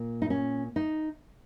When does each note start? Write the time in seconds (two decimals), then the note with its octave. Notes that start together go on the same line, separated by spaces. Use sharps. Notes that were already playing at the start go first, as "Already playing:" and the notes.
Already playing: A#2 A#3
0.22 D#4
0.30 C#4
0.76 D#4